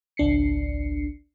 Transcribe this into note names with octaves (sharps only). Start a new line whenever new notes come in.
G#1 C#2 D4 C7 C#7